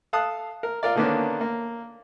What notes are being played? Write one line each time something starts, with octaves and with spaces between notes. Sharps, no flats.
A4 F5 A5 D#6 F#6
A#4
F4 A#4 D5
D3 D#3 A#3 B3 C#4 D4
A#3